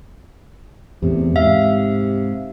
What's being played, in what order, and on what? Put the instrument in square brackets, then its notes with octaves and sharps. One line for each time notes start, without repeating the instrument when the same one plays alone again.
[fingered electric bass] E2 A2 [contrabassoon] C3
[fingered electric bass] G#2 [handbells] E5 F5